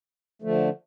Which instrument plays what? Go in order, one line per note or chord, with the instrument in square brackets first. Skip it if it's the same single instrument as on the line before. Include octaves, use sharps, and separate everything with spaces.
[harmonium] D3 F3 A3